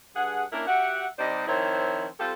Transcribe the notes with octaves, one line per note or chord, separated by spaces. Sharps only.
G2 G#4 F#5
A#3 C#4 D4 E4 A#4
F#4 G4 E5 F#5
C3 G3 D#4 C5 D5 D#5
D#3 F3 C4 E4 C5 C#5
G3 C4 F4 G4 A4